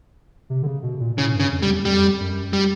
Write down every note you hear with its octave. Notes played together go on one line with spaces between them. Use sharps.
C3
D3
C#3
B2
A#2
A2 C#3
G2
C#3
F2
G3
E2
F2 G3
F#2
G3